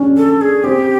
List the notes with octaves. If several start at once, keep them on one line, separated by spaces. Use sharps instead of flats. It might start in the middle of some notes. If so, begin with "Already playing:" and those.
Already playing: C#4 D4
A4
G#4
C4 G4